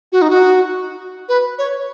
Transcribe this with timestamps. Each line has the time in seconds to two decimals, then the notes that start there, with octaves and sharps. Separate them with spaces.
0.12 F#4
0.22 D#4
0.30 F#4
1.29 B4
1.58 C#5